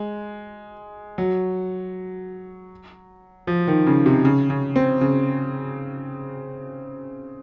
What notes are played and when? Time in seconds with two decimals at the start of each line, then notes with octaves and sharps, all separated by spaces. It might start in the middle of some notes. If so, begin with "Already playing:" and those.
Already playing: G#3
1.18 F#3
3.47 F3
3.68 D#3
3.87 C#3
4.06 C3
4.25 C#3
4.50 C#3
4.76 C4
5.01 C#3